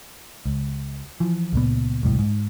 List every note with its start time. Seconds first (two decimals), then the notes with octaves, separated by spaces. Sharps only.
0.46 C#2
1.20 E3 F3
1.53 C#2 A#2 B3
2.03 E1 C2 A2
2.19 G#2